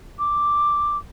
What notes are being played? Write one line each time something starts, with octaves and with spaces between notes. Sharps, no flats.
D6